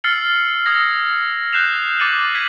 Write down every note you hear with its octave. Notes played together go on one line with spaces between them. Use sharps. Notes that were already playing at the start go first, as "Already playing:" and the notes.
E6 F6 A6 C7 C#7 F#7
D#6 E6 G#6 A#6
F#6 G6 C7 E7 F7
D6 A6 C#7 D#7 F#7
G#6 B6 D#7 F#7